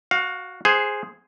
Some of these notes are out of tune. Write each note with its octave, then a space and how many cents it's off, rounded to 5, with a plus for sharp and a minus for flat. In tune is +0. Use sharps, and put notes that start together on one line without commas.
F#4 +0 F5 +20
G#4 +0 C5 +0 F#5 +0